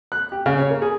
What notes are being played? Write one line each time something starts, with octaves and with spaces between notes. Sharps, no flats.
F#6
G4
C#3
C#5
A#3
G#4